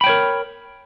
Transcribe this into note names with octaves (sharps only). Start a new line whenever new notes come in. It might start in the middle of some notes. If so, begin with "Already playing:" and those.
A#4 C#5 G5 B5